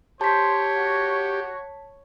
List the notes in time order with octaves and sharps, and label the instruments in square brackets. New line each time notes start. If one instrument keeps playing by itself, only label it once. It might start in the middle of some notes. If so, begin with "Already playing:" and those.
[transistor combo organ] G4 [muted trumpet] C5 [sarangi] C#5 [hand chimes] A5 B6
[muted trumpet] F#4